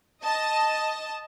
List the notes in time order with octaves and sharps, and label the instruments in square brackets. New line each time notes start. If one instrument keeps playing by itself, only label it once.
[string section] D#5 A5